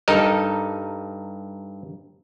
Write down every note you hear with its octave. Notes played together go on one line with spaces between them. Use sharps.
G2 D#4 A4 A#4 D#5